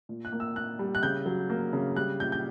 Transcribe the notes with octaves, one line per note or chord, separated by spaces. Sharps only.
A#2
F#6
A#3
E6
A#2 F#6
G3
F#6
C#3 G6
F#3
A#3
C#3
G3 F#6
A#2 G6
G6